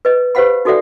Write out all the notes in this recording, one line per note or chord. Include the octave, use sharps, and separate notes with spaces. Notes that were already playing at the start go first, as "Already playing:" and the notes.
B4 D#5
G4 B4 C5 F5 F#5 B5
D#4 F#4 A4 D5 E5 F#5